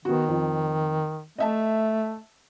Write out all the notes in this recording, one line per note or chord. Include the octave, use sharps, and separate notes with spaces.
D#3 B3 F#4
F2
A3 D#5 E5 A5